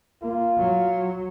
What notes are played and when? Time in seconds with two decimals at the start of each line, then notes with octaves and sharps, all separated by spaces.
0.22 A#3 F4
0.58 F#3